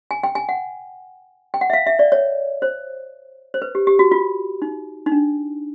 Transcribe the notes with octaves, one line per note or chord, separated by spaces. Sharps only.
G#5
G5
G#5
F#5
G5
F#5
E5
F5
E5
D5
C#5
C5
C5
B4
G4
G4
F#4
F4
D#4
D#4
D4